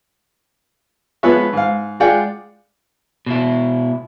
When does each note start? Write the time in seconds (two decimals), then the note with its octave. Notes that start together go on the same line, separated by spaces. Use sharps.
1.23 F3 G#3 B3 B4 C#5 E5
1.53 G#2 F5
2.00 G#3 F4 G#4 D5 F#5 G5
3.26 B2 E4